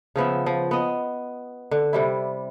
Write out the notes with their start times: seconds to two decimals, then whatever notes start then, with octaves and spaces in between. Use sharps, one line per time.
0.16 C#3 F3 B3 E5
0.46 F3
0.71 B3 D#5
1.71 D3
1.93 C3 G3 E4